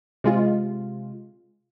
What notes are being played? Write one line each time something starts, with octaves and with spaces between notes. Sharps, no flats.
C3 G#3 F4